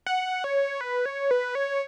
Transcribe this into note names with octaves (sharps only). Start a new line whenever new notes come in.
F#5
C#5
B4
C#5
B4
C#5